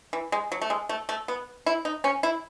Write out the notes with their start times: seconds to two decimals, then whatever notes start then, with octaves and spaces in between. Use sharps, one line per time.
0.13 E3
0.32 G#3
0.52 F#3
0.62 A3
0.70 G#3
0.89 A3
1.09 A3
1.28 B3
1.66 E4
1.85 D#4
2.04 C#4
2.23 E4